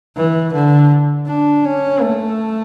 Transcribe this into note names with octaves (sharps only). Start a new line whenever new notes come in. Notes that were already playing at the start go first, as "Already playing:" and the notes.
E3
D3
D4
C#4
A3